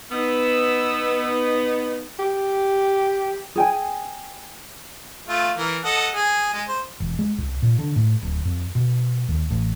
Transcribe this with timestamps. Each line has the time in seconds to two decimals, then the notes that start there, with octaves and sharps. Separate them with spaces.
0.12 B3 D#4 E6
2.19 G4
3.56 G#4 G5 G#5
5.29 A3 F4
5.57 E3 A#4
5.85 A4 D#5 F#5
6.15 G#4
6.54 G#3
6.68 C5
7.00 E1
7.19 G#3
7.38 C2
7.62 A#2
7.79 D3
7.96 A2
8.23 D1
8.45 F2
8.75 B2
9.28 D#2
9.50 A1